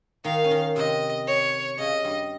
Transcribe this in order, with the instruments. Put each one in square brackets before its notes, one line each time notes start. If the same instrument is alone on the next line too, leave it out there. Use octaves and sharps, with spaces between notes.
[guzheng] D#3 D#4 [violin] F5
[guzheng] C#4
D#3 D#4
[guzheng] C3 C4 [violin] D#5
[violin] C#5
[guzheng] C#3 C#4 [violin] D#5
[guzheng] G2 G3